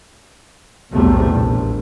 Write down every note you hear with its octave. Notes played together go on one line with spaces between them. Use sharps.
B1 E2 A2 C3 G3 A3
A#1